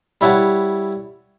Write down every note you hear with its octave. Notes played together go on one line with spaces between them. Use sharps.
G3 E4 C#5 F#5 A5